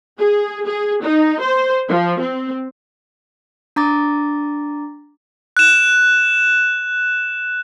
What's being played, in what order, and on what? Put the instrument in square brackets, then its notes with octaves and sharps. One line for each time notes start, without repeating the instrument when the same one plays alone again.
[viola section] G#4
G#4
D#4
C5
F3
C4
[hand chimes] D4 A#5 D6 A6
[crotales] F#6 E7